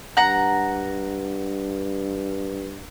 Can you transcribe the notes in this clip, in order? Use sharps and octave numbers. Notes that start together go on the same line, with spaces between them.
G2 F#5 A#5